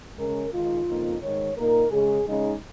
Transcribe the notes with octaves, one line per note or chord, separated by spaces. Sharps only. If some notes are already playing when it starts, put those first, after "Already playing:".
C#3 G#3 C#4 A#4
D#3 G#3 D#4 F4
F2 C#3 A#3 D#4
G#2 D#3 G#3 C#5
A#2 A#3 D#4 A#4
C#3 G#3 C#4 G#4
C#3 G#3 D#4